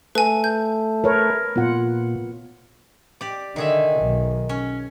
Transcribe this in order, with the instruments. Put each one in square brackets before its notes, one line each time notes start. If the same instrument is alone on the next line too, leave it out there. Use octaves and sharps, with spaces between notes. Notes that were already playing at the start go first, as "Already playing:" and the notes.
[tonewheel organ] A3 A4 [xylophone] B4 G#5
[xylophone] G6
[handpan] A#4 B4 C#5
[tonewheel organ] A#2 [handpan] B3 F4 F#5
[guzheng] G4 D5
[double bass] D3 [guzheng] D#3 G#4 E5
[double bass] B1
[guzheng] C#4